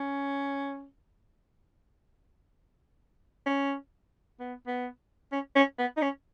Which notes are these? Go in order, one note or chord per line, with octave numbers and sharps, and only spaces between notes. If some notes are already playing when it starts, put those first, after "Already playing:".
Already playing: C#4
C#4
B3
B3
C#4
C#4
B3
D#4
C#4